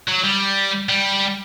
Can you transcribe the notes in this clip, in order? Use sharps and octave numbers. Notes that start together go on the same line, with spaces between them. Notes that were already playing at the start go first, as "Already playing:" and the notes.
F#3
G3
G3